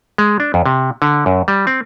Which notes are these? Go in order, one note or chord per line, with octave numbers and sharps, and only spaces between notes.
G#3
D4
F2
C3
D3
F#2
G3
C4